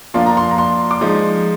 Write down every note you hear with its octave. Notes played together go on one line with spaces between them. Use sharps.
F3 A#3 D4 F4 C6
A#5
C6
A#5
C6
D6
F3 G#3 D#4 C6